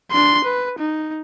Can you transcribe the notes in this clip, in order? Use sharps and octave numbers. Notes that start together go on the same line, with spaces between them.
D4 C6
B4
D#4